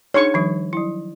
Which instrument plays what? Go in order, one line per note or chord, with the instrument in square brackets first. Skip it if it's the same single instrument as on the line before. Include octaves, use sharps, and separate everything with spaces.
[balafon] D4 D#4 G#4 [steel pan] C#5 C#6
[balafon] D#3 F3 G3
F#3 E4